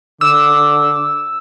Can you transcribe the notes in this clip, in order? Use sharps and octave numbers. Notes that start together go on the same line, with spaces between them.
D3 D6 E6